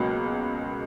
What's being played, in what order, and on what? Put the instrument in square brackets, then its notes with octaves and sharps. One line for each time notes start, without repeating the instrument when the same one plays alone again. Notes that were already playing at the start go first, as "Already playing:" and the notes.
Already playing: [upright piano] C#2 B2 F#3 A#3